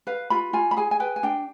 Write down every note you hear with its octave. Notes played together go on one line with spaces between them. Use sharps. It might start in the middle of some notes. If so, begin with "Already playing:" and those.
B4 F5
F4 B5
F4 G#5
B5
G#4 G#5
G#5
B4 G5
G#5
D4 G5